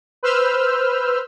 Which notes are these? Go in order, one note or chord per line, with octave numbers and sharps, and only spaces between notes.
B4 C5 E6 F6 G6